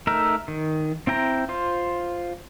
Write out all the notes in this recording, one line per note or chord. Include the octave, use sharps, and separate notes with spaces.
A3 D#4 A#4 E5
D#3
C4 E4 G5 A#5
F4 C5